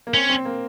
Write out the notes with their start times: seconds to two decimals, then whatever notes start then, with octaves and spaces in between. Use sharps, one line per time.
0.07 A#3
0.14 C4 C#4
0.30 C4
0.45 A#3